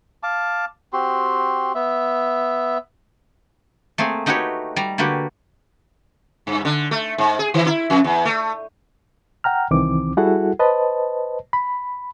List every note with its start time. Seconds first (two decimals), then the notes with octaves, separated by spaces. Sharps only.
0.23 F5 A5 D6
0.93 C4 F#4 G4 C6
1.75 B3 E5
3.98 A3 A#3 C4 G#4
4.26 A3 D#4 F#4 G4 B4 C#5
4.76 G3 A#5
4.98 D3 A#3 F#4 G4 B4
6.47 G2
6.65 D3
6.91 A3
7.18 G#2
7.39 G#4
7.54 D#3
7.66 E4
7.90 F2
8.04 E2
8.25 A3
9.44 F#5 G5 A#5 F6
9.71 C2 D#3 E3 C4 D6
10.17 G3 E4 F#4 G#4 A4 F#5
10.59 B4 C5 D#5 A5
11.53 B5